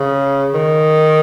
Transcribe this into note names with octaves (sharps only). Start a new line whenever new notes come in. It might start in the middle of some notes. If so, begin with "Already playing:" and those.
Already playing: C#3
D#3